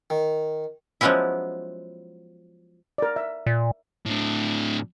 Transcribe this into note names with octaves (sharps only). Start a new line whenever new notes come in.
D#3
F3 F#3 G#3 B3 C#4 E4
A#4 D5
E5
A#2
A2 D3